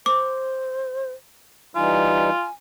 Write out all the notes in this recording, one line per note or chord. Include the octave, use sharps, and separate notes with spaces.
C5 D6
E3 G3 D#4 F4 G#5